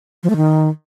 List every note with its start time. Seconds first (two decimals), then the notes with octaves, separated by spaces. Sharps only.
0.23 F3
0.30 A3
0.36 D#3